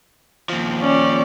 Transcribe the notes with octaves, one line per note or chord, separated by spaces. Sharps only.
D#2 F3
C#4 D5